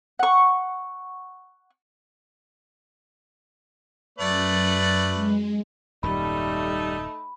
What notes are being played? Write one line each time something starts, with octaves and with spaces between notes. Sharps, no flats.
F#5 C#6
F#2 A3 B4 D5
G#3
D#1 F#2 A#2 G3 A3 D#4 B5